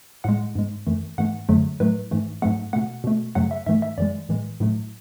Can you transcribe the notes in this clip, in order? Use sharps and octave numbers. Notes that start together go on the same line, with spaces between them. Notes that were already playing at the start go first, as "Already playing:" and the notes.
A2 G#3 F#5
G#2 G#3
F#2 E3 A3
G#2 E3 A3 F#5
F#2 D3 F#3 A3
A2 F#3 A3 B4
G#2 E3 A3
G#2 F#3 A3 F#5
B2 A3 F#5
B2 A3
F#2 C#3 F#3 A3 F#5
E5
G#2 E3 A3 E5
E5
F#2 E3 G#3 D5
A2 E3 G#3
A2 F#3 A3